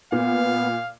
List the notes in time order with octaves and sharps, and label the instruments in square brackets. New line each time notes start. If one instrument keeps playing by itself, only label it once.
[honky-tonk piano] A#2 [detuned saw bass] B3 [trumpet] F5